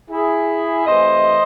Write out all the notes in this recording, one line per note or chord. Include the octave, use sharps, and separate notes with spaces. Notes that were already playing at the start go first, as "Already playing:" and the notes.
E4 G#4
C3 E3 A3 C5 D#5